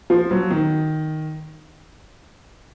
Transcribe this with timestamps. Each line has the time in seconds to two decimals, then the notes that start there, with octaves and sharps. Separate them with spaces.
0.10 F3
0.31 F#3
0.51 D#3